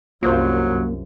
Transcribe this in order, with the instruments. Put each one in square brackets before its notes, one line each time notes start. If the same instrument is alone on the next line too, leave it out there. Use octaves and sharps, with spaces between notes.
[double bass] C2 F#2 [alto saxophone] F#3 [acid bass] A#3 [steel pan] F4 C5